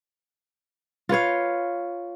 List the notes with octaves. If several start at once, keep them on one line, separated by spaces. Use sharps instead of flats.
F4 B4 C#5 F5